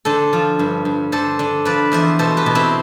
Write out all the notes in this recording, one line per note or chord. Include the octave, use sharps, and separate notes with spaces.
D3 A4 C5
F3
G2
G2
D3 A4 C5
D3
F3 B4 D5
E2 C5 E5
B2 A4 C5
G4 B4
B2
C4 E4